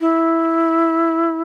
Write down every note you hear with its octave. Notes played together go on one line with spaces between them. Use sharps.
E4